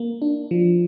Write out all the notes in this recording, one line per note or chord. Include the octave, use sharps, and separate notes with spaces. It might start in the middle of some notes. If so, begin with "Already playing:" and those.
Already playing: A#3
D4
F3